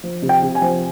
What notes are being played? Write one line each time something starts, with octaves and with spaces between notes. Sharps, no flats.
F3
C3
G5
C3
G#5
F3